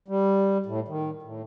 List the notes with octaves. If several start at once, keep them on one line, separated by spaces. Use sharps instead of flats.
G3
A2
D#3
A2